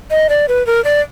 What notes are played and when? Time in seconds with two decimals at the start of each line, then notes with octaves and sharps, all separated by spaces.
0.11 D#5
0.29 D5
0.48 B4
0.67 A#4
0.84 D5